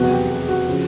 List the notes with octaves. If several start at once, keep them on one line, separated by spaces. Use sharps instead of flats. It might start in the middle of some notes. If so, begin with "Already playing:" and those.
Already playing: F1 E2 B2 F#3 B3 F#4
G4
G#4
F#4
C#3 F3